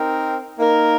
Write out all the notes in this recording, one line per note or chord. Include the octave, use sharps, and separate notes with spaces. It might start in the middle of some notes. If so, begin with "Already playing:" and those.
Already playing: C4 D#4 A#4
A#3 D#4 A#4